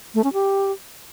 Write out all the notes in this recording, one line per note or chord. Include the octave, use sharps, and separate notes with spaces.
A3
C#4
G4